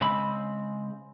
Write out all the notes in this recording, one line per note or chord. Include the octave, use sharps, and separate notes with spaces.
C#3 G#3 C4 B5